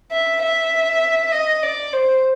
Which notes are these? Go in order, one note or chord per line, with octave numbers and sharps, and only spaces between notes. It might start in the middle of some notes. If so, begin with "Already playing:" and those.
E5
E5
D#5
D5
C5